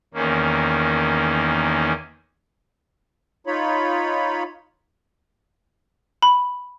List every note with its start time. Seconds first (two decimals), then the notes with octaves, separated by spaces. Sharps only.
0.14 E2 D#3 A#3 C#4
3.47 D#4 F4 C#5 B5
6.22 B5